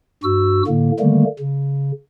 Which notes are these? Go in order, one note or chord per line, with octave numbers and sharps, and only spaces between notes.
G2 F#4 E6
A2 D3 A#3
D3 D#3 G3 A3 A#3
C#3